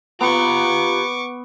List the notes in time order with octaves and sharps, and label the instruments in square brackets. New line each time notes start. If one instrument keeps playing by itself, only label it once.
[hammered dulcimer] B3 [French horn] F4 [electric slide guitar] G4 A#5 [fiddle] C#6 D6